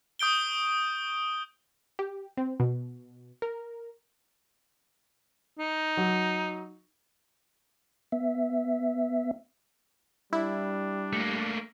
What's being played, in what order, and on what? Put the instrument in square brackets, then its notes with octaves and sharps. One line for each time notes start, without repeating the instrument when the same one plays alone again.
[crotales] C#6 D#6 G6 D7 G7
[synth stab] G4
C4
B2
A#4
[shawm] D#4
[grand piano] F#3
[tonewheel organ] B3 E5
[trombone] G3 [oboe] D4 [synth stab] E4
[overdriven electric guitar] A3 A#3